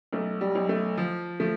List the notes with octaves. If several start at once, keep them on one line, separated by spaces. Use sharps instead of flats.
B1 A3
G3
B1
A3
F3
F3 A3